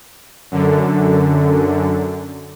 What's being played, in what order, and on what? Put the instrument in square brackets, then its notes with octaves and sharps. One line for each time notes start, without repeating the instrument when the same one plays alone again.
[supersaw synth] F#2 D3